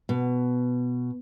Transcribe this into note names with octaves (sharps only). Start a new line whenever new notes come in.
B2